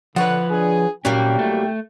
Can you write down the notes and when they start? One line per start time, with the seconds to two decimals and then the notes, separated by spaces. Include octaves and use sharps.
0.16 D3 F3 B4 C#5 F#5
0.51 D4 G#4
1.05 C2 A#2 F#3 G3 A#3 C#4 G5
1.39 A3